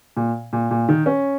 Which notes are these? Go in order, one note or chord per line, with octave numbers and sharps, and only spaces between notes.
A#2
A#2
A#2
D#3
C#4